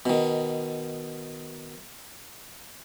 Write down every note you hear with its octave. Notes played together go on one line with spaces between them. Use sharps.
B2 D#3